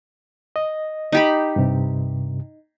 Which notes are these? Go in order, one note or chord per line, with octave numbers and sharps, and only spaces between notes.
D#5
D#4 G4 B5
G2 C3